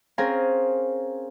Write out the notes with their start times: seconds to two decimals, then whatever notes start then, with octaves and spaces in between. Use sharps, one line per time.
0.18 C4 C#4 G#4 A#4 F5